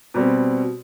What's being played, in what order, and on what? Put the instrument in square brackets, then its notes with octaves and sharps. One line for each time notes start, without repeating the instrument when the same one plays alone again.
[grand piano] B2 G3 C4